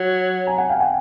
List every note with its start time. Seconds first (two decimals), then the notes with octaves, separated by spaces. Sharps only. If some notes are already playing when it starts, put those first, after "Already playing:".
Already playing: F#3
0.47 G#5 A#5
0.58 F#5 G#5
0.69 F5 G5
0.80 F#5 G#5